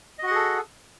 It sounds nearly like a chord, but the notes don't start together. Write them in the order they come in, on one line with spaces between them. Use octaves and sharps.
D#5 F#4 F#5 G#4 A4